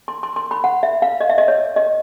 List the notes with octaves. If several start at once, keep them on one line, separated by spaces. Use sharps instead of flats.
C6
C6
C6
B5
F#5
E5
F5
D#5
E5
D#5
C#5
D#5